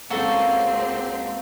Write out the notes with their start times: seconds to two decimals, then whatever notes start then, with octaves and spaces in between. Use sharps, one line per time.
0.10 C#2 A#3 C4 F#4 A4